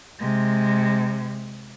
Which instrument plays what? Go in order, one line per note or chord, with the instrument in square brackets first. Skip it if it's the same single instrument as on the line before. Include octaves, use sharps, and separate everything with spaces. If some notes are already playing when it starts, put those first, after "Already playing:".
[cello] C3 G#3